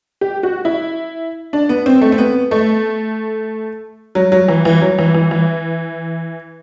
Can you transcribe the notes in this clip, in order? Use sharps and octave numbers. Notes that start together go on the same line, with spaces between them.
G4
F#4
E4
D4
B3
C4
A3
C4
B3
A3
F#3
F#3
E3
E3
F#3
E3
E3
E3